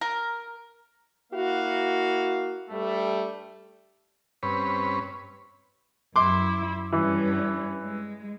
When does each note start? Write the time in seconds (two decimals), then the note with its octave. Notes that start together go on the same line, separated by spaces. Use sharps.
0.01 A#4
1.33 A#3 E4 F#4 F5
2.70 G2 G3 A3
4.43 G2 C4 C#4 B4 C#5 B5
6.16 F#2 E4 C6 D6
6.92 G2 E3 C#4
7.84 G#3